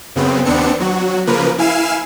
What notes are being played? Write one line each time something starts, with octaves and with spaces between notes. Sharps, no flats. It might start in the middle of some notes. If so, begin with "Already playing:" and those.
F#2 C#3 B3 C4
D#2 B3 C4 D4 C#7
F#3 F#4
C#3 F3 A#3 A#4 B4
E4 F5 G#5 F6 C7 E7